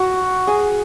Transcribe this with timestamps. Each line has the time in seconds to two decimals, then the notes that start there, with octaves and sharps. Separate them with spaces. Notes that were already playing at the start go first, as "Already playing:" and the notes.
Already playing: F#4
0.47 G#4